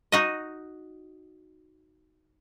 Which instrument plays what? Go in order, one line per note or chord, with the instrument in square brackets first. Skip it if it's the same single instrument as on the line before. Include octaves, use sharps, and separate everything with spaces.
[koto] D#4 F#4 D#5